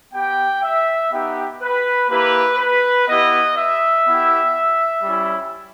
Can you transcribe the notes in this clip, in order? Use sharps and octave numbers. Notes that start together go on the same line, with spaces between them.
B3 G4 G5
E5
B3 D#4 G4
B4
A#3 E4 G4 B4
B4
B3 E4 G4 D#5
E5
B3 E4 G4
G3 C#4 E4